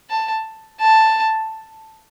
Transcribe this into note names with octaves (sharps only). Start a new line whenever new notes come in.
A5
A5